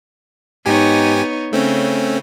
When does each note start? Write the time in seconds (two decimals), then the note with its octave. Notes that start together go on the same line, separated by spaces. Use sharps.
0.66 G#2 B3 D#4 G4 C#5 G#5
1.53 C#3 A3 C4 C#4